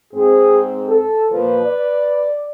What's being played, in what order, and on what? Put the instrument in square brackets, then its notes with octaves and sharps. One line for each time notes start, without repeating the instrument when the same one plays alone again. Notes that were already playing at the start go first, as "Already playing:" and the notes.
[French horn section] G#2 C4 [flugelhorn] G#4
[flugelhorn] A4
[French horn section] A#2 F3 [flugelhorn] B4
[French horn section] D5